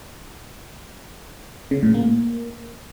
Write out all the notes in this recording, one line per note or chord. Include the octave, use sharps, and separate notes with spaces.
C#3
A2
A#3